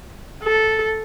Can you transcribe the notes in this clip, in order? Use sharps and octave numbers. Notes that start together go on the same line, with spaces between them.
A4